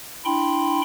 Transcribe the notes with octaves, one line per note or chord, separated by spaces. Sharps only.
D4 E4 G5 B5 C6